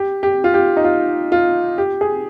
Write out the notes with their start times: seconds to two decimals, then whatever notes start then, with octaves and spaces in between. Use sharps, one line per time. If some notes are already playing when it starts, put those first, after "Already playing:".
Already playing: G4
0.23 G4
0.44 F4
0.54 G4
0.77 D#4
0.84 F4
1.32 F4
1.78 G4
2.01 G#4